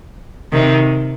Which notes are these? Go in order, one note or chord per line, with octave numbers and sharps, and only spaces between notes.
C3 D#3